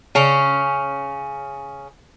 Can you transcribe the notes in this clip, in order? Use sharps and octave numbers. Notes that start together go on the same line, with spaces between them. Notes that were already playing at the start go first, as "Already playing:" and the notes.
C#3 C#4